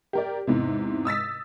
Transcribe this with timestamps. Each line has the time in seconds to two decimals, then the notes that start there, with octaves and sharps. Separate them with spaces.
0.13 G4 A#4 D5
0.47 E2 G#2 C3
1.05 D#6 E6 A6 B6